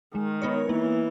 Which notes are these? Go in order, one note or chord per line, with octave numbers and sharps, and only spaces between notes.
D#3 G#3
B3 D#4 A#4 C#5
E3 A#3